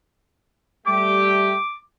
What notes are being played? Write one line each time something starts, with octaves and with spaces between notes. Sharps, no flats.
G3 A3 G4 D6